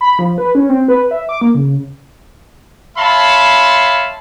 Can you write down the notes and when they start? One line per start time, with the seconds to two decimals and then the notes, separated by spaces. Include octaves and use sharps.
0.01 B5
0.19 F3
0.38 B4
0.55 C#4
0.69 C4
0.88 B4
1.11 E5
1.29 D6
1.41 A#3
1.55 C#3
2.98 C#5 E5 F5 A5 B5 C6